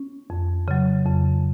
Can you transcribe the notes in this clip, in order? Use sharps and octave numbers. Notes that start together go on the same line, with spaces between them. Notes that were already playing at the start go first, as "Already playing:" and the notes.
Already playing: C#4
F2
C#3 F#3
F2